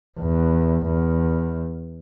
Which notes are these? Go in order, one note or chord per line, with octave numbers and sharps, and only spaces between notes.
E2
E2